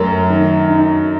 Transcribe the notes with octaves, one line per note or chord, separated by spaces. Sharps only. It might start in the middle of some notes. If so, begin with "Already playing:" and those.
Already playing: F#2 F#3 A3 A#4
D#3
D#4